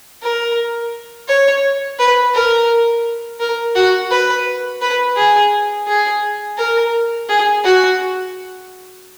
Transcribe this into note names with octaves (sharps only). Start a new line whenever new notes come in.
A#4
C#5
B4
A#4
A#4
F#4
B4
B4
G#4
G#4
A#4
G#4
F#4